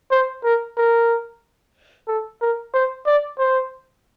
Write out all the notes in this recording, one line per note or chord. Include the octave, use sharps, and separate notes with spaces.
C5
A#4
A#4
A4
A#4
C5
D5
C5